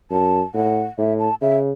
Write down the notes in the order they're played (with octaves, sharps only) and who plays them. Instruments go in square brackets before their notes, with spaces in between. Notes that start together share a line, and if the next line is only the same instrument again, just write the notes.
[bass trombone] F#2 [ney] A5
[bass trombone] A2 [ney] F#5
[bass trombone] A2 [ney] E5
[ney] A5
[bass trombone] C#3 [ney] E5